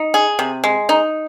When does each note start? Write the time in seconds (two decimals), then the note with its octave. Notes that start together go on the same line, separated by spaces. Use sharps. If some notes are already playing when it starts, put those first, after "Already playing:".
Already playing: D#4
0.14 G#4
0.39 C3
0.64 G#3
0.89 D#4